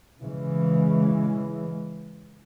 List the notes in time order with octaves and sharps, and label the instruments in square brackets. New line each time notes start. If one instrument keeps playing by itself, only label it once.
[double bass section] C#3 E3 G#3